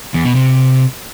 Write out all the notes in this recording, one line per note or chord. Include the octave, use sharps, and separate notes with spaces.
E2
B2
C3